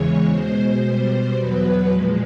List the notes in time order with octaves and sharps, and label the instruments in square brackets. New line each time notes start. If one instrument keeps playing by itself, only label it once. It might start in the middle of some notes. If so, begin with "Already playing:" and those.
Already playing: [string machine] E2 C#3 E3 G#3 C#5
B2 G#3 C5
B2 G3
E2 B2 F#3 B4
A#2 F3 G#3